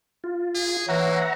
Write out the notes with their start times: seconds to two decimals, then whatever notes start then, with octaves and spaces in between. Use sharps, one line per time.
0.24 F4
0.55 G#4
0.88 E3 A#3 C#5 E5 F#5 A#5